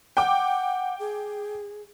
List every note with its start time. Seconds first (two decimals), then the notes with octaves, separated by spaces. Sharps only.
0.17 F#5 G5 D6
0.99 G#4